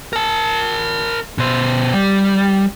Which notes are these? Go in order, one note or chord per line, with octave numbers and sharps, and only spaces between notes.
A#4 A5
B2 C5
G3